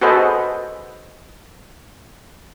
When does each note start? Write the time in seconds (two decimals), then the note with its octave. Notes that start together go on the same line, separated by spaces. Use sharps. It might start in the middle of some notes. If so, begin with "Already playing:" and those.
0.01 F#4 G#4 A4 B4 C5 D#5